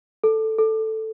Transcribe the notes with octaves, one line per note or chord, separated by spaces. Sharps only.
A4
A4